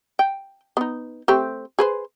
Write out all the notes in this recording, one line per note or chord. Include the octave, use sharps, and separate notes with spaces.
G5
B3 D#4
A3 C4 G4
G#4 B4 C5